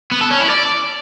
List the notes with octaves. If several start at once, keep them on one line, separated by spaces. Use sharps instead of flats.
B3
A4
C#4
E4
D5